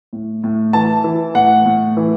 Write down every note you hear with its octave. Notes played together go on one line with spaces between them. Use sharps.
A2
A2
E3 A5
E3
A2 F#5
A2
E3